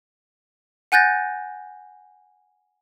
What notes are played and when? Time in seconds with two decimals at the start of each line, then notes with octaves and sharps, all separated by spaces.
0.92 F#5 G#5 F#6 G6 A6 A#6